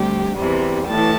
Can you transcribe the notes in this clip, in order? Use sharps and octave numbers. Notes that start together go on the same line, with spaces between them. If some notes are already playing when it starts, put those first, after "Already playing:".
Already playing: D2 C3 G3 G4
E2 C3 E3 G3
A2 E3 A5